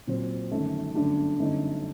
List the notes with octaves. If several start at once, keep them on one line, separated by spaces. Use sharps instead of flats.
A#2 F#3 C4
G1 F#2 D#3 A3
G1 F#2 D3 A3 D4
G1 F#2 D3 A3 D#4